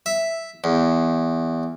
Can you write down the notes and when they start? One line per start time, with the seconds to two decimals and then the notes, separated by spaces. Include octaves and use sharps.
0.06 E5
0.64 E2